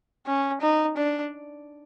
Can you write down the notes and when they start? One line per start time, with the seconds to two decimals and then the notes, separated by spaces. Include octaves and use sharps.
0.27 C#4
0.61 D#4
0.97 D4